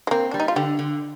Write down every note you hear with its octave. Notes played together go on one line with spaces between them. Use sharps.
G#3
A#3 C4
G3 D4
D#4
F4
D3 G4
D3